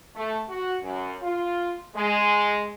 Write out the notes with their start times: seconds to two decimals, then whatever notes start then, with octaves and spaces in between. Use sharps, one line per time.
0.15 A3
0.48 F#4
0.81 F#2
1.22 F4
1.96 G#3